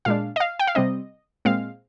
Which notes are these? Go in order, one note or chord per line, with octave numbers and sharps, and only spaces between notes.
A#2 G#3 D4 F5
D#5
F5
G5
F5
C3 G3 C4 D#5
A#2 G#3 C4 F5